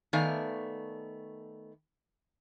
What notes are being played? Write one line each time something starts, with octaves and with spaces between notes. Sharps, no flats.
D#3 A3 B3 D5 F5 G#5